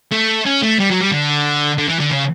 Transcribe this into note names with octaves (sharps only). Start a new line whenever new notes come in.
A3
C#4
A3
G3
F#3
G3
D3
D3
E3
D3
C#3